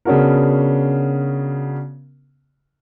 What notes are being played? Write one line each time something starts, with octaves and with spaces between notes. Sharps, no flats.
C#3 B3 C#4 D4 F#4 A#4